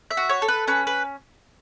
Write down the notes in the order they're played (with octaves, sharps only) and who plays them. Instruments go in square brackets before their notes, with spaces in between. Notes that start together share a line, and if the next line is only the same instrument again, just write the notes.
[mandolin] E5
F#4
C#5
A4
B4
C#4 B4
B4